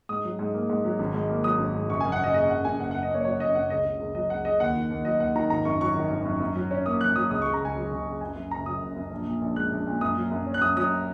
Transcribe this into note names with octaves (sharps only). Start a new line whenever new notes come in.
G#2 D#6
F#3
G#2
A#3
G#2
F#3
G#1
G#2
A#3
F#3 D#6
G#1
G#2
F#1 C#6
G#5
F#2
F#5
F#1 D#5
C#3 D#5
F#1 F#5
F#2 G#5
F#1 F#5
F#5
F#2
D#5
A#3 C#5
F#3 C#5
F#1 D#5
F#2 F#5
C#2 D#5
C#3
C#2
F#3 D#5
C#2 F#5
C#3 D#5
D#2 F#5
D#3
D#2
F#3 D#5
D#2 F#5
D#3 A#5
G#1 A#5
F#2 C#6
F#3 C#6
D#3
G#1
F#2
F#2
F#3
C#4
A#3 D#6
F#2 F#6
F#3 D#6
C#2 D#6
C#6
C#3
A#5
C#2 G#5
F#3
C#2
C#3
F#1 G#5
F#2
F#1 A#5
F#3 D#6
F#1
F#2
A#1
A#2
A#1
G#3 F#6
A#1
A#2
F#2 D#6
F#3
F#2
C#4
F#6
F#2 D#6
F#3 D#6